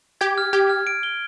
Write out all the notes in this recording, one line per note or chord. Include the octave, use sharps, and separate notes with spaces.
G4 G#6
F6
G4 G#6
F6
D7
G7